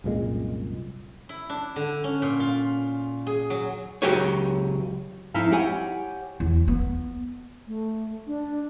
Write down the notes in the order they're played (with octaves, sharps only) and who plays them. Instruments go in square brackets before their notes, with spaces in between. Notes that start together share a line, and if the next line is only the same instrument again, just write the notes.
[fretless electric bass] C2 F#2 A#2 G#3
[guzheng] E4
D4
D3
C#4
A#2
F4
G#4
F#3
[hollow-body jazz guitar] C#2 D#3 F#3 G4 G#4 C#5
[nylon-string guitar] F2 D#4 E4 E5 F5
G4 C#5 F#5 G#5
[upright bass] E2
B3
[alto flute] A3
D4